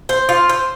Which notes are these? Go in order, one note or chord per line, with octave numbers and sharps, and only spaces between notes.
C5
F4
C5